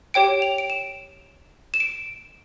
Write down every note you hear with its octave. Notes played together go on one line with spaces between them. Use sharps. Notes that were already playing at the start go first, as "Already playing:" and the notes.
G4 C#5 G5 D7
F7
D7
E7
E7
D7